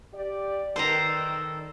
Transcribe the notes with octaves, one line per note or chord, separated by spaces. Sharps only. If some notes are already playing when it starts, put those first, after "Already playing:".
G4 D5
D#3 A4 B4 C5 D5 A#5